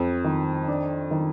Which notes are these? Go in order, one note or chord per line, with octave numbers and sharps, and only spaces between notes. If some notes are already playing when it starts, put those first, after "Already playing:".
Already playing: F2
D#3
D4
D#3